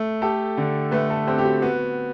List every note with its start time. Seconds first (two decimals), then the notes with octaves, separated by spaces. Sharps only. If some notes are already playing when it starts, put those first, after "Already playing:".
Already playing: A3
0.22 G4 A4
0.57 D3
0.91 A3 B4
1.10 A4
1.26 C4 G4
1.38 G4
1.44 F#4
1.62 B3 F#4